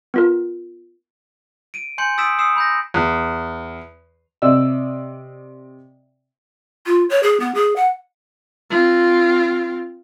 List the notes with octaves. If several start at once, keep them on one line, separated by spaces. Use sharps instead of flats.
B3 F4 A#4
D7 D#7
G#5 C6 G6 C#7 F#7
D#6 E6 A6 B6 D7 E7
D#6 E6 C7 C#7 E7
B5 G6 A#6
E2
C3 D5 D#5 E6
F4
C#5
G#4
B3
G#4
F#5
C4 F4